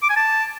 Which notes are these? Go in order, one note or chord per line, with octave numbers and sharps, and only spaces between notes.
D6
G#5
A5